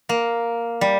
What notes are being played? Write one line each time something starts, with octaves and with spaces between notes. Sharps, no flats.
A#3
G3